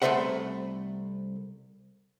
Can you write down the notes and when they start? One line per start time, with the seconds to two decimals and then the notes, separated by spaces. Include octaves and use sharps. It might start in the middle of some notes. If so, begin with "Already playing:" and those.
0.02 C2 F#2 A3 C5 E5 F#5